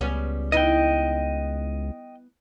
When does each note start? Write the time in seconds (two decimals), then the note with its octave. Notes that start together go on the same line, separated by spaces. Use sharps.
0.01 C#2 G3 B3 C#4
0.52 B3 D#4 E4 D#5 G5